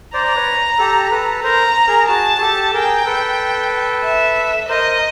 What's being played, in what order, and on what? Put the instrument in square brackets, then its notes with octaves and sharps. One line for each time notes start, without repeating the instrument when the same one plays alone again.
[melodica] C5 D5 [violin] A#5
[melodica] D5
B4 C#5
G4 A4
A4 B4
[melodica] A#4 C5 [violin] A#5
[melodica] G#4 A#4
[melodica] F#4 G#4 [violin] A5
[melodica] G#4
G4 A4
[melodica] G#4 A#4 [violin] G5
[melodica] A4 B4
[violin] E5
[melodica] A#4 C5 [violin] D#5